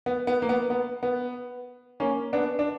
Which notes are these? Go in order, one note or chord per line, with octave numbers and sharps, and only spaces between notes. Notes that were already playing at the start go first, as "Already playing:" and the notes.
B3
B3
A#3
B3
B3
B3
A#3 C#4
B3 D4
D4